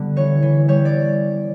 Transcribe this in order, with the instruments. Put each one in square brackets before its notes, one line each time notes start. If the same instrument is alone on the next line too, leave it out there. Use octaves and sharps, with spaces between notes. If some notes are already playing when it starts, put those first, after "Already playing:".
Already playing: [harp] D3 G3 B3
E3 C#5
E3
G3 C#5
D5